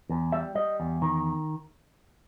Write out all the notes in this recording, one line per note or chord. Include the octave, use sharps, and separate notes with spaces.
E2
G3 E5
G3 D#5
E2
D#3